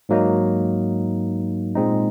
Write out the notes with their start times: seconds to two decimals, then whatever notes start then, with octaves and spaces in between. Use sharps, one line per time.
0.09 G#2 F#3 A#3 D#4
1.75 A#2 G#3 C4 D#4